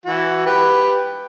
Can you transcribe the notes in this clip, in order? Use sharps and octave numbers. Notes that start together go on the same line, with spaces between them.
E3 F#4
G4 B4